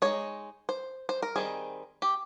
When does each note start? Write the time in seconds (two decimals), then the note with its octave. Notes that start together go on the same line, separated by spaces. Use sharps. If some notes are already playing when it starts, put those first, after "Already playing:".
0.02 G#3 D#4 C#5
0.69 C5
1.09 C5
1.22 A#4
1.36 D#3 G3 C4 D#4 G#4
2.02 G4